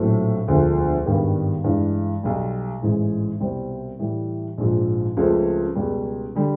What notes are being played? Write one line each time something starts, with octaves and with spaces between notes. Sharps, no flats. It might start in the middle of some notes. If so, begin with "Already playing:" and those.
Already playing: A#1 A2 F#3 A3 C4
E1 D2 D3 F3 A3
G#1 G2 D#3 G3 B3
G2 E3 G#3
B1 B2 G3
A1 G#2 E3 G#3
C2 B2 G3 C4
A2 E3 G3
A#1 G#2 F3
C#2 C#3 F3 A3 C4
C#2 B2 G3
D3 G3